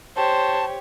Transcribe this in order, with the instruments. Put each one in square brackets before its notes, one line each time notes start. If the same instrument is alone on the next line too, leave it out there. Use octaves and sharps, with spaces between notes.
[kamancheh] G4 C#5 [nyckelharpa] C5 [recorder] A5